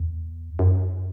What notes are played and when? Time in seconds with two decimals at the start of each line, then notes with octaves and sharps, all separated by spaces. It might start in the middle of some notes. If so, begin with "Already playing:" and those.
Already playing: E2
0.59 F#2